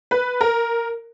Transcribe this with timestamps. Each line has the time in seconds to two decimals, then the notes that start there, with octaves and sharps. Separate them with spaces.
0.11 B4
0.41 A#4